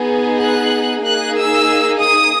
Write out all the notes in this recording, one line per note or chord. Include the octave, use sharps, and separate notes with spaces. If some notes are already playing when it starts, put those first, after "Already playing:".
Already playing: B3 D#4 G#4
F#6
A#3 D#4 G#4 F#6
E6
D#6